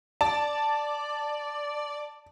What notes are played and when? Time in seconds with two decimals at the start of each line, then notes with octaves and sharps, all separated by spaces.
0.21 D5 A5